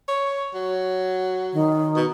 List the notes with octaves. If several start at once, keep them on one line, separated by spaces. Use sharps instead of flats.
C#5
F#3
D#3
B2